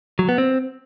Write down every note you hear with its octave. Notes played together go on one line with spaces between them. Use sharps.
F#3
B3
C4